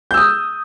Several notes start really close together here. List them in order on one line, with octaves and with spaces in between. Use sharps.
G6 E6 D#6